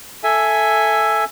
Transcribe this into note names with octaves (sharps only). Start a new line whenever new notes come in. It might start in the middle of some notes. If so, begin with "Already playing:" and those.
A4 E5 G#5